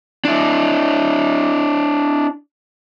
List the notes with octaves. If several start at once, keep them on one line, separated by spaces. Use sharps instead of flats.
D4 E4